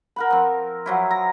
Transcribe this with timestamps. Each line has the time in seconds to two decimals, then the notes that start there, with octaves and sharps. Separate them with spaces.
0.16 A#4 F#5 B5
0.30 F3 C4
0.86 F3 F#3 E4
1.11 A#5